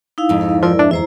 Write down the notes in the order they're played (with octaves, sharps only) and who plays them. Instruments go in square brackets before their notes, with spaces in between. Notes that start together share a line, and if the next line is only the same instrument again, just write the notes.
[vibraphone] D#4 E4 F5
[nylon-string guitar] F2 G#2
[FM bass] F3 [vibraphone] E4 A#4 D5
[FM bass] D4 [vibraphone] E5
[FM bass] E2 [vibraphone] E4 C5 A#5